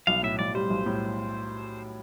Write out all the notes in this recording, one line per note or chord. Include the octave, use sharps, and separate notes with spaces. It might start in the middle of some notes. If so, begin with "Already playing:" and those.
B1 F5
A2 E5
B1 D5
G3 C5
B1
A2